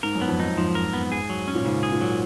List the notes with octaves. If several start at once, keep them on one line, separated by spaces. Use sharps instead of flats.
G#2 A#4
F#2
B3
F2
F#2 D#4
G#2 F3
A#4
B3
G#4
F#3
C#4
A#2
G#2 C#3
G#4
A#2
F#3